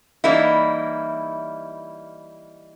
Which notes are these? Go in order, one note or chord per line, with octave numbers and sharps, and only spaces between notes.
E3 G3 A#3 D#4 E4